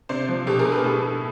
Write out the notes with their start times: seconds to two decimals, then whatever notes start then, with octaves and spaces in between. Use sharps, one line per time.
0.09 C3 C5 D5
0.29 F3
0.47 B2 G4 A4
0.59 G#4 A#4
0.65 B2
0.72 A4 B4
0.84 A2
1.03 A2